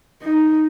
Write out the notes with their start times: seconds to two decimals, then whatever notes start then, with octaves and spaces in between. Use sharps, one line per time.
0.22 D#4